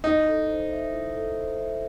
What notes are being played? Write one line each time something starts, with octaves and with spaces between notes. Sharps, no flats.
D#4 E4
A4
C5
E5
E4
A4
C5
E5